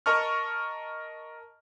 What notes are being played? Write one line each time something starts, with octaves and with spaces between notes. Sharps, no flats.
A#4 D#5 A5 C#6 F6